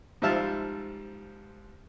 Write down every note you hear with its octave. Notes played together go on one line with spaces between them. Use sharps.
G#2 F3 G3 E5 F5 A5